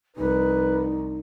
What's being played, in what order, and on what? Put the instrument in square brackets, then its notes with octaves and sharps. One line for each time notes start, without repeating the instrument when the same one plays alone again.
[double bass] C2 F3 [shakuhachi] D#4 [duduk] B4